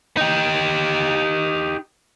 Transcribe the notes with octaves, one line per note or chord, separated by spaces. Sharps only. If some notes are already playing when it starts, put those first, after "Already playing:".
D#4 G4